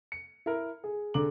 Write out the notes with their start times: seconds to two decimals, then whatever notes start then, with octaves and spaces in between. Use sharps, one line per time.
0.12 C#7
0.46 E4 A#4
0.84 G#4
1.14 D3 G#4 A#5 D6 F#7